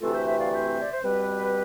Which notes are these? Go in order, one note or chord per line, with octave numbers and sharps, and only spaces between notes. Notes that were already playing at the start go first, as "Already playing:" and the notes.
D2 C3 E3 A3 C4 F4 A4
C5 E5
C5 E5
D5 F5
C5 E5
D5
C5
B2 G3 C4 G4 B4